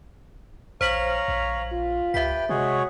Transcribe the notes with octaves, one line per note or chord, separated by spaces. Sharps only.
A#1 C5 C#5 F5 A#5 B6 F#7
A#1
F4
C#2 G4 B4 E5 G5 B6
C3 G#3 F#4 G#4 C#5